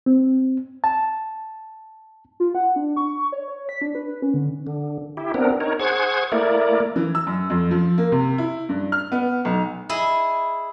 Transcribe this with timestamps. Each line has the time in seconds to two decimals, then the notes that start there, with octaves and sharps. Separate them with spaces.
0.06 C4
0.84 A5
2.40 F4
2.55 F#5
2.76 D4
2.97 C#6
3.32 C#5
3.48 C#5
3.69 B6
3.81 D4
3.95 B4
4.22 C#4
4.34 D3
4.67 D3
5.17 E4 G4
5.34 B3 C4 D4 A#4
5.60 D#4 A#4 C#5
5.79 G#4 C5 F#5 C#6 G#6
6.32 A3 A#3 E4 A#4 D5
6.96 E3
7.15 E6
7.27 F#2
7.50 F2
7.71 F3
7.98 A#3
8.12 C3
8.38 E4
8.69 G2
8.92 F6
9.12 B3
9.45 B1
9.89 E4 G#4 D#5